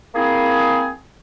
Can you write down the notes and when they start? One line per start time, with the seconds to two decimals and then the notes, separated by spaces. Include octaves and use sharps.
0.15 A#3 C4 E4 G#4